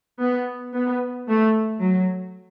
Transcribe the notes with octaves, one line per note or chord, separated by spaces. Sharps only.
B3
B3
A3
F#3